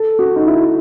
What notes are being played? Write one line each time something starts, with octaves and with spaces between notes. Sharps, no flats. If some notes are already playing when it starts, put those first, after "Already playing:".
Already playing: A4
F#4
D#4
E4